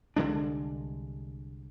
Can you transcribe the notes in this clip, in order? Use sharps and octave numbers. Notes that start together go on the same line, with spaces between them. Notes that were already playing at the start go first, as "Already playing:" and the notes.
C2 D3 G#3 D4